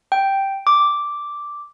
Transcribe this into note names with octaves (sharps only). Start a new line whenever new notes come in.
G5
D6